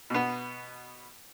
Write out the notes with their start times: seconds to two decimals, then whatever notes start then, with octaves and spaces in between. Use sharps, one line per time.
0.10 B2 B3